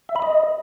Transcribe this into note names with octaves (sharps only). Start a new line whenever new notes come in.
E5
B5
D#5